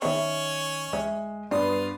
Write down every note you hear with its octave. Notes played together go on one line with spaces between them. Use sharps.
D#3 B3 C#4 C#5 D#5 E5 C#6
D2 G#3 E5
G2 B3 D4 F4 C6 D#6